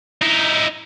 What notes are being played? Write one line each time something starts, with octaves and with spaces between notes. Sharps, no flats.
D#4 E4